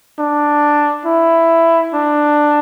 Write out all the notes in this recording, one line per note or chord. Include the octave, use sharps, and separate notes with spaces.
D4
E4
D4